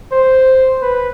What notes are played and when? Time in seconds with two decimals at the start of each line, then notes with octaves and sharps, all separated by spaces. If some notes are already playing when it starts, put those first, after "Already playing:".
0.12 C5
0.82 B4